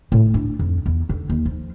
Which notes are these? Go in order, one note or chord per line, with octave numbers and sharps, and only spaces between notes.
A2
D4
F2
E2
D3
D#2
F3